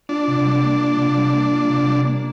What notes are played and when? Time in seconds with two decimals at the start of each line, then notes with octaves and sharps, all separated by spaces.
0.09 D4 F4
0.28 C3
0.45 G3
0.63 A#3
0.80 F4
0.98 C3
1.16 G3
1.34 A#3
1.51 F4
1.70 C3
1.87 G3
2.05 A#3